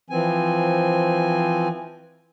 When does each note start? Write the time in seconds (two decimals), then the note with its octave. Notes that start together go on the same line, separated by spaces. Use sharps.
0.10 E3 F3 C4 G#5